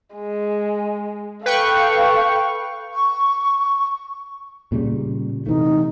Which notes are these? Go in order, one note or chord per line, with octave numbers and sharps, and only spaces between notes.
G#3
A4 B4 F5 G5 C#6
C#6
A#2 C#3 G3
C3 E3 A3 D#4